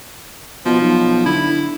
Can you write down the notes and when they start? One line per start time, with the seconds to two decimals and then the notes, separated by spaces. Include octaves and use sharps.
0.65 B2 F3
0.81 B1
1.26 D3 E4